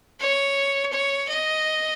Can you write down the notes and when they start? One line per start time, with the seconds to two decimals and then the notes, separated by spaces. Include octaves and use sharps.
0.20 C#5
0.92 C#5
1.28 D#5